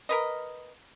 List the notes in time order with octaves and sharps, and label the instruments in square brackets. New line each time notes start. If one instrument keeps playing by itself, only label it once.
[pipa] A#4 B4 D#5